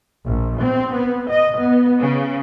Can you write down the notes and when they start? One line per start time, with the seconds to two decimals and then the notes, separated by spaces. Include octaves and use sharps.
0.25 A#1
0.59 C4
0.93 B3
1.29 D#5
1.60 B3
2.01 C#3